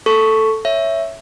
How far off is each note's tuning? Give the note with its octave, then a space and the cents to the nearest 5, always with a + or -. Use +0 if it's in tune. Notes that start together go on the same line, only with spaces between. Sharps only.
A4 +0 C#6 +0
C#5 +0 E5 +0